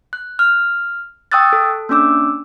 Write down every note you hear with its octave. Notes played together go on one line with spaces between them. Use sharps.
F#6
F6
G5 C#6 D#6 E6 F#6 A6
A4
A#3 C#4 D4 D6 E6